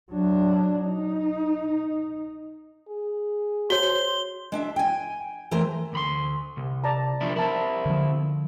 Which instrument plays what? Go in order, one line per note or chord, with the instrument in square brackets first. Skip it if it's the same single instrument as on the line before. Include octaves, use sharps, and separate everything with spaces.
[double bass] F#3 D4
D#4
[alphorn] G#4
[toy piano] F#4 C#5 [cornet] C5 [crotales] G7
[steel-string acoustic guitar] G#3 D4 E5
G5 G#5
E3 A3 A#3 A#4 C5
[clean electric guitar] D2 B5 C6
C2
[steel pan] D5 A5 A#5
[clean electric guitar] F3 D4 E4
[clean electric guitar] C4 E4 [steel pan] A#4 A5
[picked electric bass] D3 F3